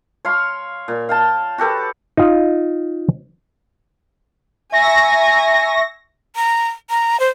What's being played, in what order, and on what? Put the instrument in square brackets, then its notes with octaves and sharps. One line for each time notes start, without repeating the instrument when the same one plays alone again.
[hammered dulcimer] C#5 F5 C6
A#2
F5 G5 A5
F#4 G4 A4 B4
[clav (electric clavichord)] D#4 F4
[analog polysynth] E5 C#6 A#6 [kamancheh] G#5 A#5
[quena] A#5
A#5
C5